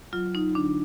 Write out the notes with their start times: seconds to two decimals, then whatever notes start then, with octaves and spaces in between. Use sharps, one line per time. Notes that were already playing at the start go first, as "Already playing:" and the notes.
0.13 F#3 F4
0.35 D#4
0.55 D3 D4